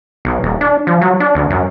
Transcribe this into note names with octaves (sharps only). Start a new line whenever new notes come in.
B1
D#1
D4
F3
F#3
D4
D2
F#2